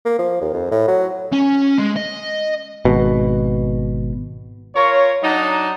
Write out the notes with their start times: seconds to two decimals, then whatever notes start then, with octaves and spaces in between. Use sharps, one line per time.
0.05 A#3
0.19 F3
0.41 D#2
0.53 F2
0.71 A2
0.88 F#3
1.33 C#4
1.78 G#3
1.96 D#5
2.85 G#1 B2
4.75 F4 A#4 C#5
5.22 F#3 D4 D#4